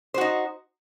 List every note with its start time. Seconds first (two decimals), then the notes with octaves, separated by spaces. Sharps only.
0.14 C5
0.18 F#4
0.21 D#4